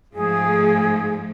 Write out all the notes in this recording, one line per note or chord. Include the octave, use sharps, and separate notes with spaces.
G#2 F3 A3 G#4